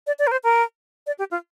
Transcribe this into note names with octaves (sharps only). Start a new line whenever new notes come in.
D5
D5
A#4
C5
A#4
D5
G4
F4